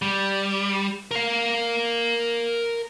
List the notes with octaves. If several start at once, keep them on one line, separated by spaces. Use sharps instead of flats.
G3
A#4 F5